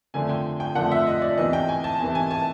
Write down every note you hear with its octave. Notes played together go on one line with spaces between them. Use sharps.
F2 D3 F3 A3 D4 G#5
G5
G5
F2 D3 F3 A3 D4 F#5
E5
D#5
D5
E2 C3 E3 D#5
G5
G#5
A5
E2 C3 E3 G#5
G#5
A5